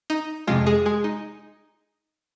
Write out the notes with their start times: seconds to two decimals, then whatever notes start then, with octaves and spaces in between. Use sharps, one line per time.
0.10 D#4
0.47 F2 C3 F3 G#3 F4
0.66 G#3 G#4
0.86 G#3 G#4
1.04 D#4